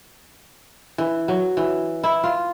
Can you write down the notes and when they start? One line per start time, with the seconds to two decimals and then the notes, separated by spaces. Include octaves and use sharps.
0.98 E3
1.28 F#3
1.57 E3
2.04 E4
2.24 F4